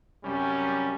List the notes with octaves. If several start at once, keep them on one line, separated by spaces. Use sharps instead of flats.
F#2 C3 G3 C#4